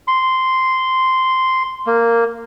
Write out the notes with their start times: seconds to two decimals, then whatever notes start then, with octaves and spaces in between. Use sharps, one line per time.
0.08 C6
1.87 A#3